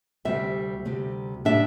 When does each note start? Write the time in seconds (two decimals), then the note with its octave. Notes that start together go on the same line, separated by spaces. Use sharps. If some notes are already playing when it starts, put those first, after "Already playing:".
0.25 D2 C3 G3 C4 E5
0.85 D2 C3 G3 C4
1.45 A2 G3 D4 E5